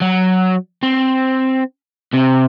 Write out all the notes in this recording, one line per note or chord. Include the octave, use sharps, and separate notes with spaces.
F#3
C4
C3